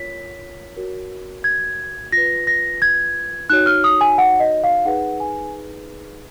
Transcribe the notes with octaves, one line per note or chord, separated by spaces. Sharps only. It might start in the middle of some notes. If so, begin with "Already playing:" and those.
Already playing: F4 A#4 C#5 B6
F#4 A#4 C#5
G#6
F4 B4 A#6
A#6
G#6
D#4 F#4 C#5 F#6
F6
D#6
G#5
F#5
D#5
F5
D#4 G#4 B4 F#5
G#5